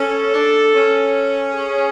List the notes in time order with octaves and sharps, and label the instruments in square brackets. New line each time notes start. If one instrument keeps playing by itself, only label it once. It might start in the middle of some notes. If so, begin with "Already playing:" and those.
Already playing: [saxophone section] C#4 [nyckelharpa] A4
[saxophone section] D4
C#4
[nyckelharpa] G#4